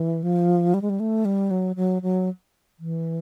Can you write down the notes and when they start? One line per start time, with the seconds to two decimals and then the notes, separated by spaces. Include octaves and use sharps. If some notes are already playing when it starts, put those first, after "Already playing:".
Already playing: E3
0.23 F3
0.74 G3
0.82 G#3
0.90 G3
1.00 A3
1.25 G3
1.51 F#3
1.76 F#3
2.02 F#3
2.79 E3